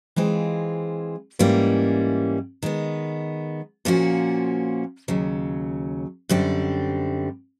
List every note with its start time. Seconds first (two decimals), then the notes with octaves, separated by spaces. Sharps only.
0.16 E3 G#3 C4 F4 G#4
1.39 G#2 E3 G3 A#3 C#4
2.63 D#3 G#3 B3
3.85 A#2 F3 A#3 C#4 F#4
5.08 D#2 C#3 F#3
6.29 F#2 D3 G3 C4